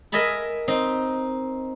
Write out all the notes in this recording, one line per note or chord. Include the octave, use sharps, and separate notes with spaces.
A#4 D#5 E5 G#5 A5 B5
C4 D#4